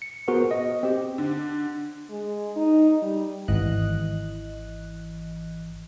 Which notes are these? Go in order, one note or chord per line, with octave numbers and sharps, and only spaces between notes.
C#7
B3 F#4 G#4 A#4 C5
D#5
C4 G4
D3
G#3
D#4
G3
G#1 E3 D#5 F#6